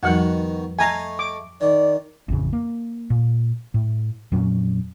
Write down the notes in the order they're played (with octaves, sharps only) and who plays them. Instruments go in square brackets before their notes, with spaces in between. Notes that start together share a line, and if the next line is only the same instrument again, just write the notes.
[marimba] F2 F3 G3 [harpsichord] B2 D#3 [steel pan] F#5
[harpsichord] A3 D#5 F5 [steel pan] G#5 A#5
[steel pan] D6
[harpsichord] D#3 [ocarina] D5
[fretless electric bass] A1 F2 C#3
A#3
A#2
A2
F2 A#2 F#3 C#4